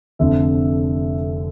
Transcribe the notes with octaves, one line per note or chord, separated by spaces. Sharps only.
F1 F2 D3 E5